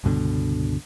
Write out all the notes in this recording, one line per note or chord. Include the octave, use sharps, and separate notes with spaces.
C#2 G2 B2 D3